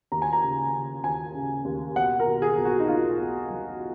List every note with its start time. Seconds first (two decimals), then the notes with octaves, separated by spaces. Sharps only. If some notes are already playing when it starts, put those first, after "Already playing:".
0.12 D#2 A#5
0.22 G#5
0.33 A#5
0.42 C#3
0.73 C#3
1.04 D#2 G#5
1.34 C#3
1.65 D#2
1.96 B1 F#5
2.19 A#4
2.27 B2
2.42 G#4
2.58 B1
2.65 F#4
2.80 D#4
2.88 B2 F4
3.19 B1
3.50 F#3